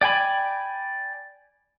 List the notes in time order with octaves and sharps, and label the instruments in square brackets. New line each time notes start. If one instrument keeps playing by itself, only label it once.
[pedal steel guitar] D5 G5 G#5 B5